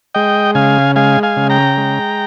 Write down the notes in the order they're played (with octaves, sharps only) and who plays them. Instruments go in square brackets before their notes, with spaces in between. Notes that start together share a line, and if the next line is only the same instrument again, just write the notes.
[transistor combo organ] G#3 D#5 G5
C#3 F5 G#5
G#3 F5 G#5
F5 G#5
C#3
G5 A#5
G#3